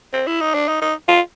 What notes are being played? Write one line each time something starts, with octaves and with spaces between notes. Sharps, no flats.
C4
E4
D#4
D4
D#4
D#4
F4